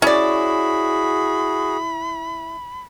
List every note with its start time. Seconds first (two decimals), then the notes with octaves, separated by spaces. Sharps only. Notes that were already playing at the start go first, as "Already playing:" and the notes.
0.02 C#4 E4 F#4 G#4 D5 B5